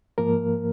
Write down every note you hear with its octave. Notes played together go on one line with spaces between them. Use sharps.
G#2 F3 A#3 A#4